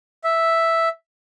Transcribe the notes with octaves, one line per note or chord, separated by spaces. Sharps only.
E5